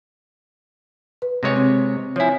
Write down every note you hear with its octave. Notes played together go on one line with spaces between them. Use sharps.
B4
C3 G#3 C#5
C4
F3 E4 C#5 G#5